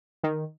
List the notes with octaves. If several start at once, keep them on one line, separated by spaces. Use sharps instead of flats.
D#3